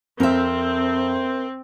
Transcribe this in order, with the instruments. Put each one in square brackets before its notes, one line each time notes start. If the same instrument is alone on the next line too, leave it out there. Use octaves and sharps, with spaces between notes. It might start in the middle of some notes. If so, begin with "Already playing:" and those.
[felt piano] F2 [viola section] C4 [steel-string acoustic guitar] A#4 E5